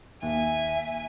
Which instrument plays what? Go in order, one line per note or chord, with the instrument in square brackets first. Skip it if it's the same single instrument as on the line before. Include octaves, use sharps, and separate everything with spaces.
[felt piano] D#2 [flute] E5 [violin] G#5